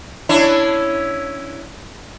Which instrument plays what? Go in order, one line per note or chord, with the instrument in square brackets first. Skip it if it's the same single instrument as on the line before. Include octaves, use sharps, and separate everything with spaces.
[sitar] C#4 D4 E4